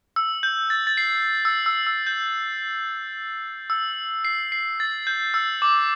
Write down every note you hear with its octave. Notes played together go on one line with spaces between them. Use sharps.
E6
G6
A6
A6
C7
E6
E6
E6
G6
E6
C7
C7
A6
G6
E6
D6